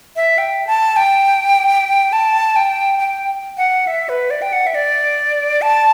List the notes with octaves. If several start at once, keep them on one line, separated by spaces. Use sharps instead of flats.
E5
G5
A5
G5
A5
G5
G5
F#5
E5
B4
D5
G5
F#5
E5
D5
A5